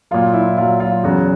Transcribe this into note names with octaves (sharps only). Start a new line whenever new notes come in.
A#2 F#3 F4
E4
A#2 F#3 F4
F4
E2 C#3 F#3 F#4